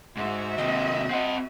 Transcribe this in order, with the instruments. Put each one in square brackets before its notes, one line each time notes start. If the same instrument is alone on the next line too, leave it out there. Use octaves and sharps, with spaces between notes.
[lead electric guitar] G#2 [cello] F#4 E5
[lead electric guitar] D#2 C3 [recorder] D#5
[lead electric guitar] C4 D#5 [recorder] F#5